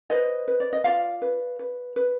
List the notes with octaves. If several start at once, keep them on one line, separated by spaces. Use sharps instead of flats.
B4 C5 D#5
B4
D5
D#5
F4 D5 F5
B4
B4
B4